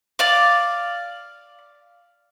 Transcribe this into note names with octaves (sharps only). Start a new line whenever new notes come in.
D5 F5 D6